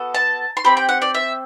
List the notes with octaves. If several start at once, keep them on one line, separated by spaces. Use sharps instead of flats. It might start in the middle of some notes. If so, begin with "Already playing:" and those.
Already playing: B3 F#4 A4
A5
C6
C4 G4 B5
G5
F#5
D5
E5